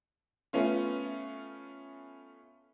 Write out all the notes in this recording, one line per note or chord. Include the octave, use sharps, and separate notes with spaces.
A3 B3 C#4 F4